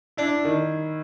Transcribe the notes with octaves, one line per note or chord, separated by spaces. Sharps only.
D4 E4
D#3